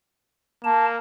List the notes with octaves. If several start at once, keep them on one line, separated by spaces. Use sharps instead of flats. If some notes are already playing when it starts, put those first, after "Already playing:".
A#3 A5